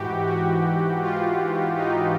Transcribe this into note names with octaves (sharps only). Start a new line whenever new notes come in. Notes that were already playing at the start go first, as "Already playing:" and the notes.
Already playing: G#2 E3 F#4 G4
F#4
F4
D#4